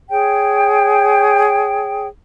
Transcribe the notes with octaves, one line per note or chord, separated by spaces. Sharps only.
G#4 C#5 G5